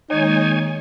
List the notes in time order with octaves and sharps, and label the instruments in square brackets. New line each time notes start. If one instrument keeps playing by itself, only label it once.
[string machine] D#3 G#3 A#3 [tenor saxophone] D#4 [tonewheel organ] C#5 G#5